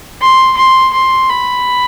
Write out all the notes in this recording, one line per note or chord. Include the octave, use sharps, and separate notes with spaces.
C6
C6
C6
B5